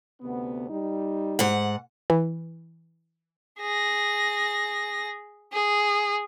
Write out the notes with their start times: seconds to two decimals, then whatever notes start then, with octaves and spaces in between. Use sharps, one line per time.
0.21 D2 C3 B3
0.70 G3 D#4
1.39 G#2 F#5
2.10 E3
3.60 G#4 A#6
5.53 G#4